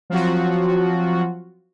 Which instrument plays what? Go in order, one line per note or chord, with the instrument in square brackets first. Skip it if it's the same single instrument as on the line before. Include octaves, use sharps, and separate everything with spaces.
[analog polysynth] F3 F#3 C4 F4 F#4